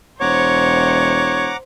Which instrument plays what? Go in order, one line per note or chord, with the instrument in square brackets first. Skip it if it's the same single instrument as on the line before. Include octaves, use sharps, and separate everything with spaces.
[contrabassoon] E1 [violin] C5 [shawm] C#5 [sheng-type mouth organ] F#5 A#5 D6